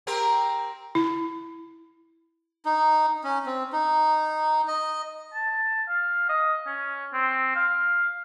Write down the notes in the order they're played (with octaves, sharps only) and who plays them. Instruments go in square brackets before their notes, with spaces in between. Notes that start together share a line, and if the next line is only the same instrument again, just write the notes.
[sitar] C4 G4 A#4
[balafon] E4
[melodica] D#4
C#4
C4
D#4
D#5
[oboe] A5
F5
D#5
C#4
C4
F5